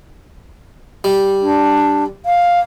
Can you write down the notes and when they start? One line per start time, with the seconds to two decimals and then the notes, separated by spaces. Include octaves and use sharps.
1.04 G3
1.42 D4
2.26 F5